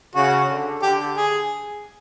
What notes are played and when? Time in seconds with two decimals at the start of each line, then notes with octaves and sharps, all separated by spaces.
0.15 C#3 F#4
0.49 D3
0.82 D3 G4
1.17 G#4